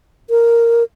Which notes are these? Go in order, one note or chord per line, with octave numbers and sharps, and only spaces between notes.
A#4